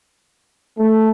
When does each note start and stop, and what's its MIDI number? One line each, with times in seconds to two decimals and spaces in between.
0.79 1.11 57